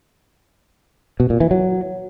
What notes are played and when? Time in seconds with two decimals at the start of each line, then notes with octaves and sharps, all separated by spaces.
1.20 B2
1.30 A#2
1.40 E3
1.51 F#3